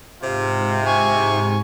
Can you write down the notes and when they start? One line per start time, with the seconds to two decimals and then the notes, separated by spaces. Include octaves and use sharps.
0.22 G#2 C3 F4
0.86 G#5 C#6